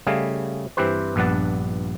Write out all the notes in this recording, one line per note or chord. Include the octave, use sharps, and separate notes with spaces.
C#3 G3 A3 D#5 F5 G#5
G2 E3 C4 G4 B4 C5
A#1 G2 B3 D4 F#5 A5